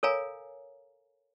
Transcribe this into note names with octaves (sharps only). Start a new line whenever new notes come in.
A4 A#4 C#5 F5 G#5 A#5